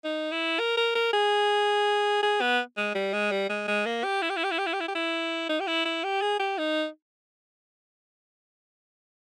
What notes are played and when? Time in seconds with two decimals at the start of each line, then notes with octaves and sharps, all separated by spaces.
0.04 D#4
0.32 E4
0.59 A#4
0.77 A#4
0.95 A#4
1.13 G#4
2.23 G#4
2.41 B3
2.77 G#3
2.95 G3
3.13 G#3
3.31 G3
3.49 G#3
3.68 G#3
3.86 A#3
4.04 G4
4.22 E4
4.30 G4
4.37 E4
4.44 G4
4.51 E4
4.58 G4
4.66 E4
4.73 G4
4.80 E4
4.88 G4
4.95 E4
5.49 D#4
5.60 G4
5.67 E4
5.85 E4
6.04 G4
6.22 G#4
6.40 G4
6.58 D#4